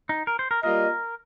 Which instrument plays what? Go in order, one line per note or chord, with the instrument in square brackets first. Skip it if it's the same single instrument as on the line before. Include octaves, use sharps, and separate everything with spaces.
[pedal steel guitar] D#4
A#4
C5
A#4
[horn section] G3 A#3 F4 D#5 [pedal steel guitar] A#4